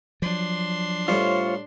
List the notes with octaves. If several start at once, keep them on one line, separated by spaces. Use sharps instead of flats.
F3 F#3 D4 C6
A2 G3 F4 C5 C#5